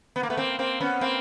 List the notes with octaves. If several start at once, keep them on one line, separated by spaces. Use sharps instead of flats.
B3
A#3
A3 B3
A#3 C4
A#3 C4
B3 C#4
A#3 C4